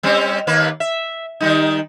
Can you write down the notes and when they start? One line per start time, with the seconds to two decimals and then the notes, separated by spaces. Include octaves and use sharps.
0.03 G3 C4 C#4
0.47 D#2 A#3 B4
0.80 E5
1.40 D#3 G3 D#4